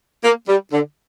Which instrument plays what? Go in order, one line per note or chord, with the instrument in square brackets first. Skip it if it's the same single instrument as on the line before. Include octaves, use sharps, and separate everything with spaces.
[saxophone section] A#3
G3
D3